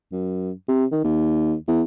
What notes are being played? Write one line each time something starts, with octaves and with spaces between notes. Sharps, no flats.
F#2
C3
D#3
D#2
E2